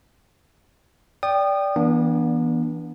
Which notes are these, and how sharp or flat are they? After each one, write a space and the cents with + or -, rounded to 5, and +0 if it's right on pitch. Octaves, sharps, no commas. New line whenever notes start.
D5 -15 G5 +0 D#6 -30
E3 +0 B3 -40 D4 +0